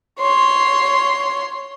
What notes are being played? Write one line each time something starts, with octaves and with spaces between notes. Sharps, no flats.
C#5 C6